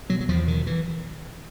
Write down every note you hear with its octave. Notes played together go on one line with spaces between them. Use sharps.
B2 F#3
F#3
E2 F3
B2 D#3
E3